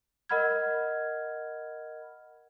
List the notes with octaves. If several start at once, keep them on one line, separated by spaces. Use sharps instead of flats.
A#4 D#5 F#5 B5 F6 G#6